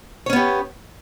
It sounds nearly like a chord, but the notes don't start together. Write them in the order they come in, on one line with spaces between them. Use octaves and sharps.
C#5 C#4 B3 G4